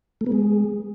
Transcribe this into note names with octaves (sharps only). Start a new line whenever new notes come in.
A3
B3
G#3